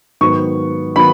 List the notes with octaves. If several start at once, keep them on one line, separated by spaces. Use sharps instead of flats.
G#2 D#3 F#3 B3 C#6
D#3 F#3 B3 B5